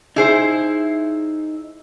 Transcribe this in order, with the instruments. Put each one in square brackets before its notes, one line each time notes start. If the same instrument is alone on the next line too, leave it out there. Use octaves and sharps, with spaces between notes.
[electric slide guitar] D#4 E5 [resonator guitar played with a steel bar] E4 G#4 C5